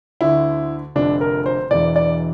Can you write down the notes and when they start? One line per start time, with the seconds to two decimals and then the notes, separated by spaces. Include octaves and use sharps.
0.21 D2 D3 E4
0.96 F1 F2 D3 D4
1.21 A#4
1.46 C5
1.71 E1 E2 E3 D5
1.96 D5